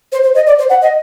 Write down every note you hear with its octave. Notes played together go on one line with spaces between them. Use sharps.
C5
C5
D#5
D5
C5
F#5
D#5